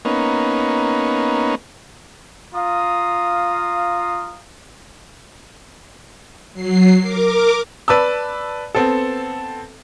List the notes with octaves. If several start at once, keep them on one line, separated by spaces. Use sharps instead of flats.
A#3 B3 C#4 D#4
F4 F5 A#5 D#6
F#3 C7
A#4 D6
B4 D5 A5 E6
B3 C4 A4